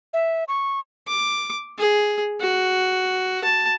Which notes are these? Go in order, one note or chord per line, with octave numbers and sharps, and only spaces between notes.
E5
C#6
D6
G#4
F#4
A5